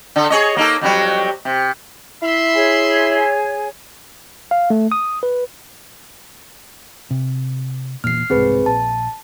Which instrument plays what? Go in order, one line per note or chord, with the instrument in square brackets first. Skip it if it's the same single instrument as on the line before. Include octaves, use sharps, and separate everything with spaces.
[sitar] D3 A4
G#4 C#5 D#5
A#3 D#4 A4
F2 F#3 G3
C3
[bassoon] E4 [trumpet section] E5 B5 C6
[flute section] G#4 C#5 G#5
[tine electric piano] F5
A3
D#6
B4
[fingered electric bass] C3
[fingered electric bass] E1 E2 A#2 [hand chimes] F6 C7
[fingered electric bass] E1 C2 G#2 [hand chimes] C4 G#4 B4
[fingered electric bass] A#1 [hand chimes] A5